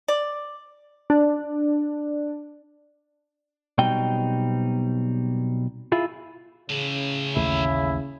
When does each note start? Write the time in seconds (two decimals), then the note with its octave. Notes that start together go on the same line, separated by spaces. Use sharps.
0.08 D5
1.10 D4
3.78 B1 B2 G3 C4 D#4 G5
5.92 E4 F4 G#4
6.69 A2 C#3 E3
7.36 A1 D#2 A3 E4